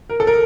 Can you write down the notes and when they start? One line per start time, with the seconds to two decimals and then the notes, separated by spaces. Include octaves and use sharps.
0.10 A#4
0.20 A4
0.27 A#4